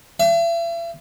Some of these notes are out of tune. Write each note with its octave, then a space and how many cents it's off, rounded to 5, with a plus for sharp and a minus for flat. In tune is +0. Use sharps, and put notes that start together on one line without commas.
E5 +40